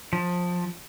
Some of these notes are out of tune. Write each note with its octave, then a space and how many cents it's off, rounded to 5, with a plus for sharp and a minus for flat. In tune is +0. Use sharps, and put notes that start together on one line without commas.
F3 +20